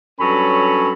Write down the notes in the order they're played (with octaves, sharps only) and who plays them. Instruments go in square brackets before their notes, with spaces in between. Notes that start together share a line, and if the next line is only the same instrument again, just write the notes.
[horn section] G2 F#3 C#4 A4 B5